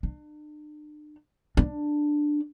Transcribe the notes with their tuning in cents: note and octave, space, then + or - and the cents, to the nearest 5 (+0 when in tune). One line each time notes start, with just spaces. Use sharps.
D4 +40
D4 +10